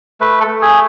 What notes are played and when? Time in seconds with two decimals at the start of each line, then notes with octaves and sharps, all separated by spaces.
0.21 A3 B4
0.41 A4
0.47 A3
0.61 G#4